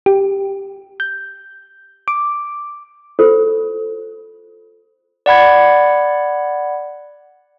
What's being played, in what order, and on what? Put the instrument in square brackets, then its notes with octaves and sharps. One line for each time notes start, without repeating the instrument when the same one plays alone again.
[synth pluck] G4
G6
D6
[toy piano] F4 A4 C5
[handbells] D5 F#5 B5 G#6